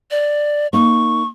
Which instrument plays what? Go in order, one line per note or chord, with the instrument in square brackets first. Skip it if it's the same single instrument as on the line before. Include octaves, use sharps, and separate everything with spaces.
[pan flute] D5
[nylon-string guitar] A#3 D#4 [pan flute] C#6